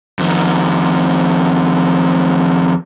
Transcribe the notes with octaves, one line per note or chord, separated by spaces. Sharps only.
F2 D#3